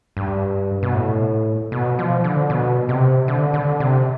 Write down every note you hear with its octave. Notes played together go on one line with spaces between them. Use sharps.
G2
B2
A2
B2
F3
D3
B2
C3
D3
D3
C3